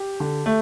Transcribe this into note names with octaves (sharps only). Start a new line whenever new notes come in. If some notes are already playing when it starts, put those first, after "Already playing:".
Already playing: G4
D3
A3